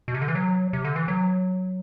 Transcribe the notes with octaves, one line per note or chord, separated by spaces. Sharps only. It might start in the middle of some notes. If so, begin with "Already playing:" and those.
B2
C3
D3
E3
F#3
C3
D3
E3
F#3